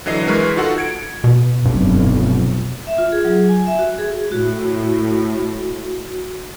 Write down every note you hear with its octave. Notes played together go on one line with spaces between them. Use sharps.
D3 E3 F#3 D#5 C7
C2 E3 G#3 A#4 B4 C#6
D#4 F4 F#4 A4 F#5
G#6 C#7 D7
B2
F1 B1 G2
E5
F4
G#4
F#3
G#5
E5
F#4
G#4
A2 F#4